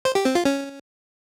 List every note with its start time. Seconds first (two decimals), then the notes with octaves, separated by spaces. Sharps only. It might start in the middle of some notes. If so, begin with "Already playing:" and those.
0.05 C5
0.15 G4
0.25 C4
0.35 F4
0.45 C#4